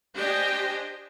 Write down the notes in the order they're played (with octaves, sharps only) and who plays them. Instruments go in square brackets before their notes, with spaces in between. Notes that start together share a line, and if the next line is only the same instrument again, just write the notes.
[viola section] D4 G4 C5 D#5 G5 G#5